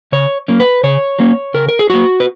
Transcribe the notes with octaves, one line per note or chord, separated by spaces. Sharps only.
C#3 C#5
F#3 A#3 C#4
B4
C#3 C#5
F#3 A#3 C#4
C#3 A#4
A#4
G#4
F#3 A#3 F#4
B4